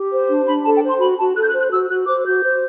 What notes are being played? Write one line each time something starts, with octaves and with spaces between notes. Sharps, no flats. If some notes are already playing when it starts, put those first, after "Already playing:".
Already playing: G4
C5
D4
D4 B5
A4 A5
G5
C5
C6
F#4 B5
F#4 A5
A4 F#6
G6
F#6
C5
F#6
F#4 E6
F#4 F#6
C5 D6
F#4 G6
C5